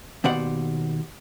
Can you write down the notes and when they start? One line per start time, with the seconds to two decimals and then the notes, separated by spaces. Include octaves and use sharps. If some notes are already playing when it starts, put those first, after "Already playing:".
0.24 D#2 B2 C5 D5 F#5